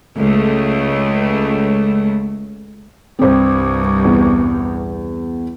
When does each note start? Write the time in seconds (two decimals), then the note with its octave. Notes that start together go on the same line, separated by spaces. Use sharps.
0.17 C#2 A3
3.19 C2 G2 C4 C5
4.05 E2